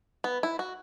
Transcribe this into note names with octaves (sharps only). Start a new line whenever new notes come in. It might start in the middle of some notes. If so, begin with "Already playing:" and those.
B3
E4
F#4